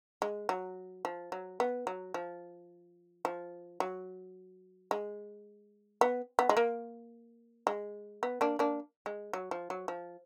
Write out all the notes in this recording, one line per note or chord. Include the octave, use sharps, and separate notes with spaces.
G#3
F#3
F3
F#3
B3
F#3
F3
F3
F#3
G#3
B3
B3
G#3
A#3
G#3
B3
A#3 D4
A#3 D4
G#3
F#3
F3
F#3
F3